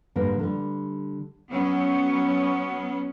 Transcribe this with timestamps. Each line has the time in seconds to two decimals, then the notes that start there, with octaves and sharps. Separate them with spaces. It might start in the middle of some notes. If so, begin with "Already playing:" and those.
0.15 G#2 D3 G3 A#3 A#4 B4
0.39 D3 G3
1.50 F#3 B3 C#4